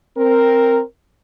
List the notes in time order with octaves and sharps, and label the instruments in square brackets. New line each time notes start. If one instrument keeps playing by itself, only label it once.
[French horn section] C4 A#4